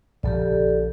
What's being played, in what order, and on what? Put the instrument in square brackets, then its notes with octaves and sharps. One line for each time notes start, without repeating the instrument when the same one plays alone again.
[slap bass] A#1 C#3 F3 [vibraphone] G4 A4 D5